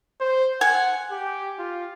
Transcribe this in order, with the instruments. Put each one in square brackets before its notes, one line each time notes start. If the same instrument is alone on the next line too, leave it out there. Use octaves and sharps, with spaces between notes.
[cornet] C5
[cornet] F#5 [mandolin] G#5
[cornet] G4
F4